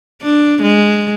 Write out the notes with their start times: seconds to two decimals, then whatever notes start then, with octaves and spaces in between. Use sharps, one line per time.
0.22 D4
0.62 G#3